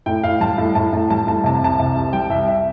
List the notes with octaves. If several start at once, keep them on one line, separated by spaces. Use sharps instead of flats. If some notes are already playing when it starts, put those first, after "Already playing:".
A2 G5
A2 F5
G3 A5
A2
A2 A5
A2 A5
G3 A5
A2 A5
C3 A5
C2 A5
C3
C2
G3 G5
C2 E5
E5